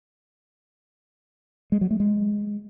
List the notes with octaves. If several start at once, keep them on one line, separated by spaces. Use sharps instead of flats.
G#3
F#3
A3
G#3